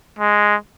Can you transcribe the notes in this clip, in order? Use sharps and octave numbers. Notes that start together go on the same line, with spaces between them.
G#3